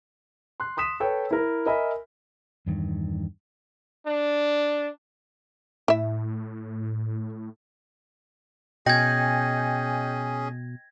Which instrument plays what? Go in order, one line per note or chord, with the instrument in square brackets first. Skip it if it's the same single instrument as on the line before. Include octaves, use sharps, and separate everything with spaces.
[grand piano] C6 F#6
C6 D#6 B6 E7
A4 B4 C#5 G5
E4 A#4
A#4 D#5 E5 G#5 B5
[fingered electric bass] E2 G2 D#3
[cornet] D4
[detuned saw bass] A2 [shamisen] E4 E5
[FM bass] B2 [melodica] C#4 G#4 [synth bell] D#5 G5 G6 [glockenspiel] G#6 A#6